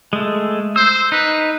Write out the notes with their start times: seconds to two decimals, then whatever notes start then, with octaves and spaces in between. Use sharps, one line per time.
0.13 G#3 A3
0.76 C5 E6
1.12 D#4 B4